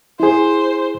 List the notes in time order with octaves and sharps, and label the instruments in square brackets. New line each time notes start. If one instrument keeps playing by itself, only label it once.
[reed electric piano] E4 G#4 [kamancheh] C5